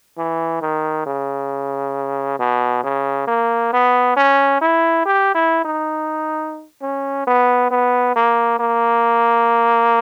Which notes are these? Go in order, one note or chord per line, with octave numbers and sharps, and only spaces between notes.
E3
D#3
C#3
B2
C#3
A#3
B3
C#4
E4
G4
E4
D#4
C#4
B3
B3
A#3
A#3